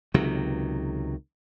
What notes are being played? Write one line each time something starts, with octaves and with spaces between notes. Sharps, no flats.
C#2 C3 D#3 F#3